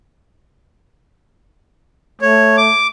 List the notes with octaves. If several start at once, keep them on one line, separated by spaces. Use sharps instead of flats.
A3 C#5
D6